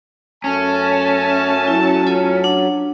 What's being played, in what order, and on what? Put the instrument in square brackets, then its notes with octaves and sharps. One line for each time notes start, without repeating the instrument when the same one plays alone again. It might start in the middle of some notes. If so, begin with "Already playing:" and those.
[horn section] F#2 A3 A5 [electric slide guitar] C#4 [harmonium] G#5
[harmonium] F#3 [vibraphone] E4
[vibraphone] F4 A4 C#5
D4 F#5